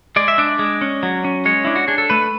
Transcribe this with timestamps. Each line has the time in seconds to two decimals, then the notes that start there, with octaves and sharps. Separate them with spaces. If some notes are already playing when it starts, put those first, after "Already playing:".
0.16 G#3 D5
0.28 E5
0.38 D4 D5
0.59 G#3
0.82 C#4
1.03 F#3
1.24 C#4
1.45 G#3 C#5
1.65 D4 E4
1.76 F#4
1.88 D4 G#4
1.98 A4
2.10 A3 B4